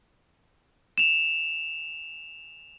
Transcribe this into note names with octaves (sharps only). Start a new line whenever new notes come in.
E7 F7